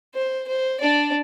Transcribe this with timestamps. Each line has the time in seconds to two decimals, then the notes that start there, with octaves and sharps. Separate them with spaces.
0.15 C5
0.48 C5
0.80 D4 D5